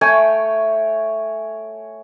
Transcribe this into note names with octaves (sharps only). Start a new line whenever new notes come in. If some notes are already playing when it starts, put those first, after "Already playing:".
A3 C#5 G5 G#5